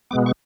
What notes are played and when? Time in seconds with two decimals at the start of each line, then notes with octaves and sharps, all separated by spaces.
0.11 B2 G#3 B3 D6
0.26 C#6